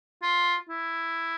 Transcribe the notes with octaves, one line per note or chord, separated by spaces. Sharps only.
F4
E4